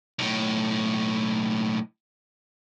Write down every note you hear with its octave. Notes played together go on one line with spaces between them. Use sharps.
B1 A2